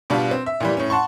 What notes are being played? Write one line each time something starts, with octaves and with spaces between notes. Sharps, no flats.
B2 G3 D4 F4
C4
E5
A#2 E3 G3
A2 C#4
F#5 A5 C6 C#6